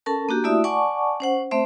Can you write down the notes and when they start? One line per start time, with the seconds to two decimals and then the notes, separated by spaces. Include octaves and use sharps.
0.06 C#4 A4 A#4 A5
0.29 A#3 D4 F#4 G4
0.44 A3 E4 F#4 D5 E5 D#6
0.64 D5 F#5 G#5 A5 C#6 D6
1.20 C#4 C5 F#5
1.51 A3 C4 C5 E5